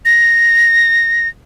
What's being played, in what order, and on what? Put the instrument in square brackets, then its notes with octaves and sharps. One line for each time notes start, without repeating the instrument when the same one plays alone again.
[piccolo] A#6